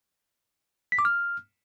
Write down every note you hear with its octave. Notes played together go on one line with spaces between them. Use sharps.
B6
D6
F6